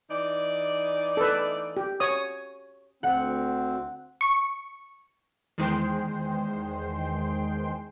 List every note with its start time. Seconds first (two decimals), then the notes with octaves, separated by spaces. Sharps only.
0.10 E3 D#4 D5
1.17 A4 B4
1.77 G4
2.00 C#5 D#6
3.03 D2 C4 F#5
4.21 C#6
5.58 E2 D#3 G#3 C5 G5 C6